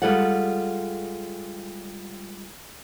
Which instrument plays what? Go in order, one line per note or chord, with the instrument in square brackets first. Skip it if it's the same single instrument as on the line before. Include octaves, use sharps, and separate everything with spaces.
[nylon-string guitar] G3 G#3 F4 A4 D5 F#5